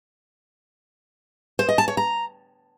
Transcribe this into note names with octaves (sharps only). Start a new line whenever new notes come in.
C5
D#5
A5
C#5
A#5